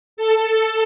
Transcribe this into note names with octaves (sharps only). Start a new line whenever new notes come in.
A4